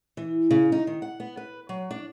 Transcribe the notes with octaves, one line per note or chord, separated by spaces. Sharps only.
E3
C#3
D#4
D#3
F#5
B3
B4
F#3
D4